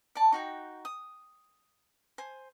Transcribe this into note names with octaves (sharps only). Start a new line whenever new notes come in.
D5 A5
D#4 F#4 G5
D#6
C5 G#5